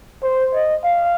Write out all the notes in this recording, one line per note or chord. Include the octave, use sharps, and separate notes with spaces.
C5
D#5
F5